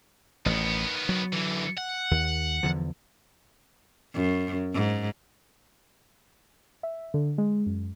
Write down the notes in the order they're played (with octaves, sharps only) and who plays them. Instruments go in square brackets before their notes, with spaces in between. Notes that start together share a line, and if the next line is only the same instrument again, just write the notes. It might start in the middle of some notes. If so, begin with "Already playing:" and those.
[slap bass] A1 [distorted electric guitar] D#3 B3
[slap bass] F#3
[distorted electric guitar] D3 E3
F#5
[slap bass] D#2
E2 D3 F3
[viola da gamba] F#2
G#2
[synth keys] E5
D3
G#3
F#2